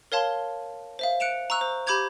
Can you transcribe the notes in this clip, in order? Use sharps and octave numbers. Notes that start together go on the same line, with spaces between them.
A#4 C#5 F5 A5 C6
C5 E5 F5
F#6 C#7 D7 E7 F7
A#5 C#6 E6 F#6
C5
G4 B5 D6 G6 G#6 F7